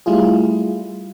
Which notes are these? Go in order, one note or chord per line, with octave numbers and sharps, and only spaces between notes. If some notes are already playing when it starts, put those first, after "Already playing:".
G3 A3 E4 F4 G#4